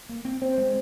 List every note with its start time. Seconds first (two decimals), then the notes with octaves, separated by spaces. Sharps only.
0.09 A#3
0.25 C4
0.41 C4 C5
0.58 G#3